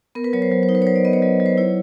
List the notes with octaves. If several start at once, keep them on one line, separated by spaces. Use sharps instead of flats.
B3 A#4
B4
F#3 C#5
C5
F#3
C5
D#4
B4
C#5
F#3 C5
D5
B3 D#5
C#5
F#3
F#3
C5
E4 C#5